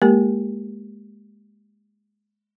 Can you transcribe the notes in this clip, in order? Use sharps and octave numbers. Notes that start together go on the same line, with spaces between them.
G#3 A#3 G4 A#4